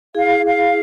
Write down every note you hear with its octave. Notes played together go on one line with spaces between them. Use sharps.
E4 G#4 F5
F5